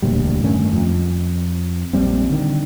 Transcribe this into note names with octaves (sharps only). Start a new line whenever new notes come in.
E1 D2 A#2 G3
G2 D#3 A3 C#4
F2
A#1 F#2 G3 C4
D3 D#3